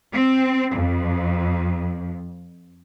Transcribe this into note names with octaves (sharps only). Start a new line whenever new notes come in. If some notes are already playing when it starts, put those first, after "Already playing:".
C4
F2